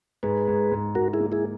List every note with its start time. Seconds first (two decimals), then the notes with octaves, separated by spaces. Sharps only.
0.23 G#2 G#4 B4
0.47 G#2
0.71 G#2
0.95 G#2 F#4 A#4
1.13 E4 G#4
1.20 A#3
1.32 E4 G#4